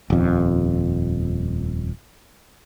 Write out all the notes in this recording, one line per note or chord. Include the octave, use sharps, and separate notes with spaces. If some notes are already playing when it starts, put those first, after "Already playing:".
D#1 F2